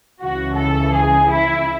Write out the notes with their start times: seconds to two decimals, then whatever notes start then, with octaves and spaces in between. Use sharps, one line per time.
0.22 C#2 C#3 E3 F#4
0.57 A4
0.94 G#4
1.29 E4